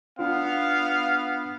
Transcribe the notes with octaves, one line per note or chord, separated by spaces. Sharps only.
B3 D4 F4 F5